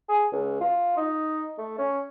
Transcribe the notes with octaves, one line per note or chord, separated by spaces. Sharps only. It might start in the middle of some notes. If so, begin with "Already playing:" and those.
G#4
C#2
F4
D#4
A3
C#4